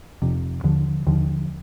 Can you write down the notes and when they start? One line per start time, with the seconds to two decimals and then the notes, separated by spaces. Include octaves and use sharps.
0.22 F1 F2 C3
0.64 D#2 D3 F3
1.07 D#2 D3 F3